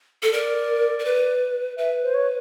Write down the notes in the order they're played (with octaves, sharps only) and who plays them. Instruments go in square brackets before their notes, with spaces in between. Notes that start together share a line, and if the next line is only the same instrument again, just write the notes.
[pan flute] A4
[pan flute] A#4 [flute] D5
[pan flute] A#4
B4
[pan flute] B4 [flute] E5
[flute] C5
C#5